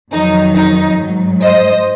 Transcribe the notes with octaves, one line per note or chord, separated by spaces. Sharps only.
F2 D#3 F#3 D#4
D#4
G#2 F#3
C5 D#5